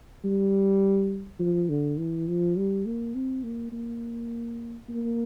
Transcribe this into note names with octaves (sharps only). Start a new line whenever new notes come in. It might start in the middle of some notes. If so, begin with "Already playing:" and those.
G3
F3
D3
E3
F3
G3
A#3
C4
A#3
A#3
A#3